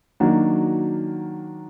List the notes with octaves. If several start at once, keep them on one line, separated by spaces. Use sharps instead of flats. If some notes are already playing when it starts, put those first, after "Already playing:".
D#3 F#3 A#3 D4 F#4